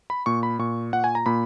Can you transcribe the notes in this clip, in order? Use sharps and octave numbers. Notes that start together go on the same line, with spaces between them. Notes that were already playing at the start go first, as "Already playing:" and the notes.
B5
A#2 C#6
B5
A#2 C#6
A#2 F#5
G#5
A#5
A#2 B5